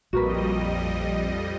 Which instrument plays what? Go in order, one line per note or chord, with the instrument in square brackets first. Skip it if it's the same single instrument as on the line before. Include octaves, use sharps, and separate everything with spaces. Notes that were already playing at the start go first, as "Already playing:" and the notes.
[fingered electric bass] A#1 A#2 [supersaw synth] F2 G3 D#5 [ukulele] F#4 A#4 B4